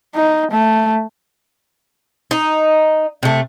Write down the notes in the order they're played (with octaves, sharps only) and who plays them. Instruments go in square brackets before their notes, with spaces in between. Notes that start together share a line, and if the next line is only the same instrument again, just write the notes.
[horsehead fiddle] D#4
A3
[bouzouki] D#4
C3 A3